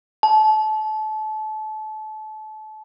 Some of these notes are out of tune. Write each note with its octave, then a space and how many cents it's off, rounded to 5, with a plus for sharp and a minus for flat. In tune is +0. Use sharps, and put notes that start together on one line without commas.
A5 -30